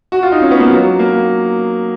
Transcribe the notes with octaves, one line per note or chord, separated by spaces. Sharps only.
F#4
F4
D#4
C#4
B3
A#3
F#3
A#3